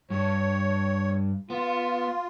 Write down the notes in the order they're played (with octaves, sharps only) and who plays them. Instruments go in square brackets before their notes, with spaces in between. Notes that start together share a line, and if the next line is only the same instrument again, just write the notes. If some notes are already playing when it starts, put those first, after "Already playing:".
[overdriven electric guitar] G2 [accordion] C#5
[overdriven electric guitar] B3 [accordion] F4